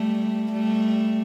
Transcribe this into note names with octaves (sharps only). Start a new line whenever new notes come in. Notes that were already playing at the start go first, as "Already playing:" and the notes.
Already playing: G3 A3
G3 A3